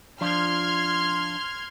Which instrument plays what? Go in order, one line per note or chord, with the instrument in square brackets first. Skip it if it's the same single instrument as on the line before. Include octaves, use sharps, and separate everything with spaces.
[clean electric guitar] F3 D4 F4 [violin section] C6 F6 G#6